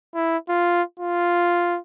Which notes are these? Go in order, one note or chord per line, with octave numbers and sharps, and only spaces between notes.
E4
F4
F4